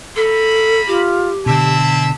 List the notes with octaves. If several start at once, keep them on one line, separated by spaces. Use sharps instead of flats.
A#3 A4 B5
F4 G4
B2 D3 C4 E4 E5 A5